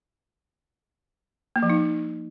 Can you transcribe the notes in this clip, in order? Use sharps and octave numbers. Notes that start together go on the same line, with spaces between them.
A#3
F3
D#4